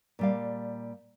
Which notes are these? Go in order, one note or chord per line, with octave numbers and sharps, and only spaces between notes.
A#2 G3 F5